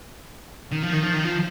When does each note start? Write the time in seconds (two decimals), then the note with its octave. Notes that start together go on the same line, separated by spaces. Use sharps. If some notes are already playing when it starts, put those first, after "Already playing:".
0.72 D#3
0.84 F3
0.94 D#3
1.03 F3
1.14 D#3
1.25 F3